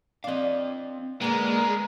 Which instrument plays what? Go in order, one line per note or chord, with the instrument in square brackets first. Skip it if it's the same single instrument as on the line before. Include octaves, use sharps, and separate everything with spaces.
[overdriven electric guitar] C4 F5 [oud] D4 D#5
[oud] D3 A#3 [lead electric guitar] G#3 [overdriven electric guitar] B3 [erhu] A#4